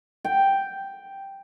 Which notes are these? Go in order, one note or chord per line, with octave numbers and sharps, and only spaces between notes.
G5